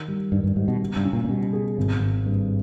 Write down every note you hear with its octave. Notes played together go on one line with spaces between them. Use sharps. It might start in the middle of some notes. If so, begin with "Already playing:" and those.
Already playing: D#3
G3
G2 D#3
G2
G#2 G3
B2
C#3
G2
C#4
A#2
A#2
B2 G3
G#4
G#1
G#1
G2